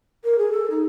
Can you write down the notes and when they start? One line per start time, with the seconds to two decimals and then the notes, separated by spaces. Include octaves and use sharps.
0.24 A#4
0.38 G#4
0.52 A4
0.70 D#4